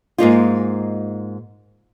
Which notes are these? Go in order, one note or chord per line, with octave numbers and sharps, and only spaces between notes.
G#2 A#3 D#4 F4